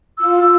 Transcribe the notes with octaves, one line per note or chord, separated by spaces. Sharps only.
F4 E6
F4